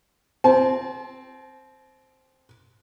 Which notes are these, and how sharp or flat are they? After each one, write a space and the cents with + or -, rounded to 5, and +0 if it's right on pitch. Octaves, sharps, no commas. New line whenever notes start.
C4 +0 A5 -40